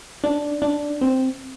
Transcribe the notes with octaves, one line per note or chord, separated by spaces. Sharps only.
D4
D4
C4